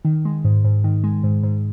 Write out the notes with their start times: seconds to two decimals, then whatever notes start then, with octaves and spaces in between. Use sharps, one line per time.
0.05 D#3
0.25 G#3
0.45 G#2
0.65 G#2
0.84 D#3
1.04 G#3
1.24 G#2
1.43 G#2